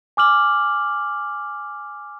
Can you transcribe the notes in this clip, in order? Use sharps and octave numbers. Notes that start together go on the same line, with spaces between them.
G#5 D6 F6 F#7